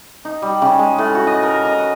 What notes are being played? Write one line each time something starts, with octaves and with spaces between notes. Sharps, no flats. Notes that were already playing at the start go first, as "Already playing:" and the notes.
D#4
G3
C#3
G#3
A2
F#4
D#5
A#4
D#5
F#5